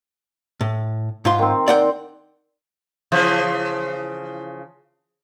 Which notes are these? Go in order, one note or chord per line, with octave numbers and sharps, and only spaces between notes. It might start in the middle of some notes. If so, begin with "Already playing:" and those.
A2
G#2 F4 C6
D#3 C4
D5 F#5 G5
C#3 E3 F3